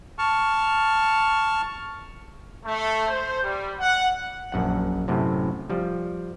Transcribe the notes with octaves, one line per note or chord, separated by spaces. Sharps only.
A5 C#6 F6
A3
C5
G3
F#5
A#1 F#2 F#5
F#2 A2 C3
F3 G3